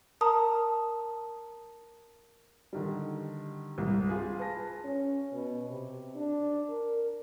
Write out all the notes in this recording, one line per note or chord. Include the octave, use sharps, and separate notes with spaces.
A#4 A5 A#5 D#6
D3 D#3 G3
C2 G2
F4 G#4
B4 G#5 A5 A#6
C#4
B2
C3
D4
A#4